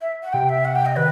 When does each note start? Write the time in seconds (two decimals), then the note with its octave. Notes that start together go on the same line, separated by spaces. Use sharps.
0.01 E5
0.23 F#5
0.33 C3 G5
0.49 E5
0.65 F#5
0.76 G5
0.86 D#5
0.96 D#3 B4